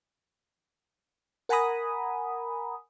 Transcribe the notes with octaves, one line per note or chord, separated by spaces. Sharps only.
A#4 F#5 G#5 A#5 B5 D#6